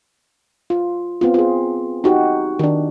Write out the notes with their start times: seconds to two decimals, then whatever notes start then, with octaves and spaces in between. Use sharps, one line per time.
0.70 F4
1.21 B3 C4 F4
1.34 F4 G#4
2.04 D#4 F#4 G4
2.59 D#3 D4